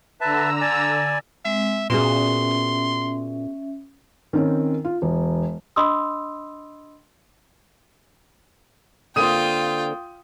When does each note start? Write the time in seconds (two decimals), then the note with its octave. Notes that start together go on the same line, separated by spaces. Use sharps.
0.21 D3 B4 E5 A5 A#5 E6
0.61 D5 G#5
1.45 G#3 C4 E5
1.90 A#2 B3 C#4 F#4 G#4 E5 C6
4.33 D#3 C4 C#4
4.85 F4
5.02 E1
5.76 D4 D#5 B5 C6 D#6 E6
9.16 D3 A#3 C4 F4 G5 D#6 D#7